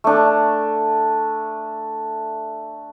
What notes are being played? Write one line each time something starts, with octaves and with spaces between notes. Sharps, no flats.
A3 D4